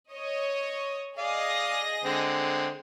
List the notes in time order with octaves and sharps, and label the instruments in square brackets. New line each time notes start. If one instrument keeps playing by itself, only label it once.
[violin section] C#5 D#5
[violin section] G#4 D#5 A#6 [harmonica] D5 F5
[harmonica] D3 G#3 C4